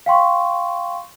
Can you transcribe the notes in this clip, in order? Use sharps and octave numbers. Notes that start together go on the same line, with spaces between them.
F5 G5 C6 C#6